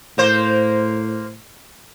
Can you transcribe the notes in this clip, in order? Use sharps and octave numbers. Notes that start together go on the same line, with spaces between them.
A2 A#3 C5